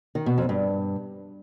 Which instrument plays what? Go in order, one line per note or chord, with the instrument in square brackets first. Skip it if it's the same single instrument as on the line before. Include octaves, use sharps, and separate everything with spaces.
[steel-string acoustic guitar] D#3
B2
F2
G2